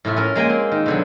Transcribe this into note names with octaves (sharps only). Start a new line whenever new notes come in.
A2 C3 F4 E5
C#4 F4 A#4
G#3 A#3 G5 G#5
C4
D#3
B2 D3 F#3